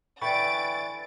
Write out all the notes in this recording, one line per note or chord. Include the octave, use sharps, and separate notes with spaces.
D3 E3 G5 B5 C#6 A6 D7